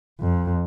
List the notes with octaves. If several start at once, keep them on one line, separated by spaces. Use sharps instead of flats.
F2